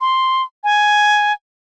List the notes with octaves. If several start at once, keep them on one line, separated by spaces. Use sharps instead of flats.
C6
G#5